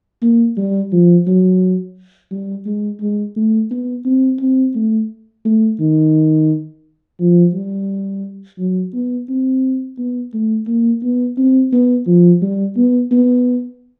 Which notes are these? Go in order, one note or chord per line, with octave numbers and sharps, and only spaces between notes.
A#3
G3
F3
F#3
G3
G#3
G#3
A3
B3
C4
C4
A3
A3
D#3
F3
G3
F#3
B3
C4
B3
A3
A#3
B3
C4
B3
F3
G3
B3
B3